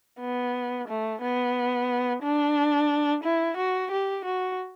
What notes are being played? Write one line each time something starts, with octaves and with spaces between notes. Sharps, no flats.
B3
A3
B3
D4
E4
F#4
G4
F#4